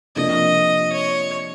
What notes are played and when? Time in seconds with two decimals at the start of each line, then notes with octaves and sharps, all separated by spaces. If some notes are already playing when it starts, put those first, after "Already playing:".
0.16 C3 F3 A#3 D4 D#5
0.93 C#5